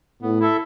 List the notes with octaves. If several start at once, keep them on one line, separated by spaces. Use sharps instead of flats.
A2 B3
E4 A4 E5